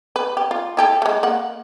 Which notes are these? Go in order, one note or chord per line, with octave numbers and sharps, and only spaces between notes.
B4
G4
F4
E4 G4 A4
G#3 A3
A#3 F#5